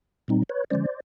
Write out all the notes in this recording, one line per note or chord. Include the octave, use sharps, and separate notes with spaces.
A#2 G3 C4 D#4
B4 C#5
D3 F3 G#3 C#4 C5 D5